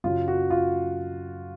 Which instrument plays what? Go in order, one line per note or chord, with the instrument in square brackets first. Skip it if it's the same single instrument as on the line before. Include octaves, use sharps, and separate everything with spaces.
[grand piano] F#2 C#3 F#3 F4
F#4
F4